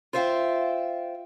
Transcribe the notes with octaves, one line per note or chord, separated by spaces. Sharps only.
F4 C5 E5 F5 G5